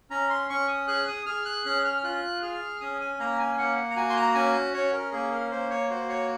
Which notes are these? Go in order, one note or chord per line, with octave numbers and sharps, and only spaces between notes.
C#4 A#5
C6
C#4 C#6
D#6
G#4 F#6
D#6
G#4 F6
F#6
C#4 F#6
F6
F4 F#6
G#4 F6
C#4 D#6
G#5
A#3 A#5
G#5
A#3 F#5
F#5
A#5
F#4 G#5
C6
A#5
C#4 G#5
C#4 C#5
A#4
A#3 G#4
A#4
A#3 C5
C#5
F#4 C5
C#5